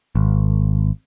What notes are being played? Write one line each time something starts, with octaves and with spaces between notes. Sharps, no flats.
G#1